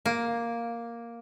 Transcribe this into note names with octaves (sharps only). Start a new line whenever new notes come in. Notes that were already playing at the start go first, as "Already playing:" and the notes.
A#3